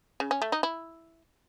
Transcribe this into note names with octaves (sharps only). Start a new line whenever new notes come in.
C#3
C#4
A3
D#4
E4